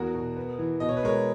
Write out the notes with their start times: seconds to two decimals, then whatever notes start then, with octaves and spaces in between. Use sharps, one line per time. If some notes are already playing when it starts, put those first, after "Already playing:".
Already playing: E2 F#4 A#4
0.14 B2
0.37 B3
0.59 E3
0.80 B2 D#5
0.89 C#5
0.97 B4
1.03 G#3 A#4 C#5